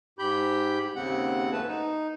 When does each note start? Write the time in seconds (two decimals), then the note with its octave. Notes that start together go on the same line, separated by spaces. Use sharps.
0.19 G#2 G4 B5 G6
0.95 D#2 C#3 C4 F#5
1.53 F#2 A3 B4 A5
1.68 D#4